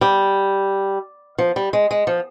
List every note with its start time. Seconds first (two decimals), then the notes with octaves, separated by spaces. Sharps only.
0.01 G3
1.38 F3
1.56 G3
1.73 G#3
1.91 G#3
2.07 F3